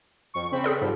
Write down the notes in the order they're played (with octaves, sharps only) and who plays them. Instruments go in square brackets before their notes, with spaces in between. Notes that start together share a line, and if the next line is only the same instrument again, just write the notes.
[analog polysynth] F2 C#6
C#3 C4 B5
[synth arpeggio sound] G#4 A4 D5
[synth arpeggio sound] G#2 [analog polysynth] F3 G3